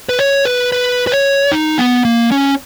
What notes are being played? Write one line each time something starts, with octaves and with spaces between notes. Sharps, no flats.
B4
C#5
B4
B4
B4
C#5
D#4
B3
A#3
C#4